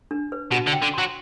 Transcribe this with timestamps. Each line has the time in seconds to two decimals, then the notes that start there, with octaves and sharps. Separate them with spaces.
0.11 D4
0.32 B4
0.52 B2 F#4
0.67 D3
0.73 G5
0.82 D3
0.94 F#3 C6